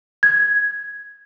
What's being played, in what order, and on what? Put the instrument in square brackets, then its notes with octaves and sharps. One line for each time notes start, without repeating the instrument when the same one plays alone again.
[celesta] G#6